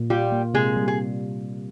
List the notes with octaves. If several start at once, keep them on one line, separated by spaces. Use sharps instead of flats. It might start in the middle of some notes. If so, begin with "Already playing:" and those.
Already playing: A#2
G3 F4 G4
A#3
C3 G#3 G#4
G3
G#4